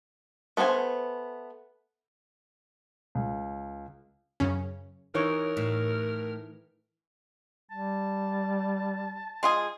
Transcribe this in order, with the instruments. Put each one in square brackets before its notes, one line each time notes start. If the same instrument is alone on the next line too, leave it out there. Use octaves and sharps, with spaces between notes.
[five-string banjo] A3 B3 B4 C5 G#5
[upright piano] C#2
[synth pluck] F#2 C#3 C#4
[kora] E3 D#4 C#5 [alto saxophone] A#4
[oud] A2
[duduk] G3 [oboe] A5
[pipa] G#3 F4 G#4